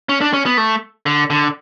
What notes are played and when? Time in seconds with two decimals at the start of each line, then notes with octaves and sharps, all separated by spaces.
0.09 C#4
0.21 D4
0.33 C#4
0.46 B3
0.58 A3
1.06 D3
1.30 D3